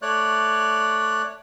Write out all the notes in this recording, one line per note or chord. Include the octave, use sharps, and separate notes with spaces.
A3 C#5 D5 F#6